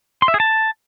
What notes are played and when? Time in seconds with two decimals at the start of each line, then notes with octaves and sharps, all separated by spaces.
0.22 C6
0.28 E5
0.34 G#4
0.40 A5